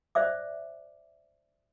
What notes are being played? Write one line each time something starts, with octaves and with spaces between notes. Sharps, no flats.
C5 D5 E5 D6